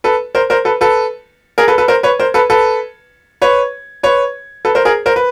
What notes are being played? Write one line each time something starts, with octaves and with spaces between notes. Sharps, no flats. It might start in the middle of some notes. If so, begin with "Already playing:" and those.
A4 B4
A#4 C5
A#4 C5
A4 B4
A4 B4
G#4 A#4
A4 B4
A4 B4
A#4 C5
B4 C#5
A#4 C5
A4 B4
A4 B4
B4 C#5
B4 C#5
A4 B4
A#4 C5
G#4 A#4
A#4 C5
B4